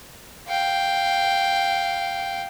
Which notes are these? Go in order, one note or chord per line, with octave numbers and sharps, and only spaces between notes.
F5 G5